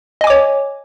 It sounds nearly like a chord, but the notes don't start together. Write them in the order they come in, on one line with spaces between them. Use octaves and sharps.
D#5 G#5 D6 C#5